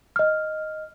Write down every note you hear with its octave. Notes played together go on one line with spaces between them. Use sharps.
D#5 F6